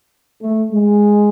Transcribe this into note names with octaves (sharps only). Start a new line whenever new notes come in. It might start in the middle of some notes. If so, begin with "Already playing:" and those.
A3
G#3